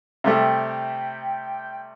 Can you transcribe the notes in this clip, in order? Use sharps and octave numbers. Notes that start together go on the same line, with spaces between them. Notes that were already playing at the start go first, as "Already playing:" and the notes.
C3 G3 A3 G5